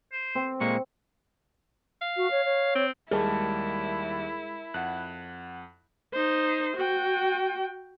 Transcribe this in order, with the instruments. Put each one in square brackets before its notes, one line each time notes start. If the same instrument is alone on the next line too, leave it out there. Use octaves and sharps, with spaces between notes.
[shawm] C5
[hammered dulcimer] C4
[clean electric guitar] A#2 G#3 A#3 [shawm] C#6
[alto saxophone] F5
[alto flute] F#4
C#5
C#5
[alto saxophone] C4
[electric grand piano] D#2 G3 [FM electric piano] G#3 [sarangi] E4 [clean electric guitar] A#4 C#5 A5
[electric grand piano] F2 [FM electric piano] F#5 F#6
[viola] D#4 C5
F#4 G5